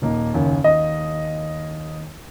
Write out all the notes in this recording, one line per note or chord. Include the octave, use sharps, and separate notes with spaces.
D#1 A#3 D#4
F#1 D#2 C#4
D#2 D#5